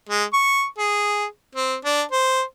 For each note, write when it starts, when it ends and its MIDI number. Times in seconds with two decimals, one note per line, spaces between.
0.09 0.24 56
0.33 0.65 85
0.78 1.25 68
1.55 1.76 60
1.85 2.02 62
2.11 2.41 72